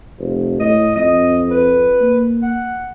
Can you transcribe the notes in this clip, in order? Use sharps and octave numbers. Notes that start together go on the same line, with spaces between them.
F1
A2 D#5
F2 D#5
B4
A#3
F#5